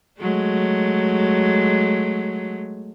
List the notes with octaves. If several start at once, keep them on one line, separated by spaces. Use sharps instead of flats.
F#3 G#3 A3